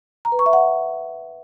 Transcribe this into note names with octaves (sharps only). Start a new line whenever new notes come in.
A#5
B4
C#6
E5
F#5